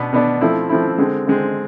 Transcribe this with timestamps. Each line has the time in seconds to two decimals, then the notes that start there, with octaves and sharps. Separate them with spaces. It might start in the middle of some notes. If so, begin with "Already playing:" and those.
Already playing: B2 B3 D4
0.13 B2 B3 D4
0.41 F3 A3 C4 E4
0.69 F3 A3 C4 E4
0.98 D3 G#3 C4
1.27 D3 G#3 C4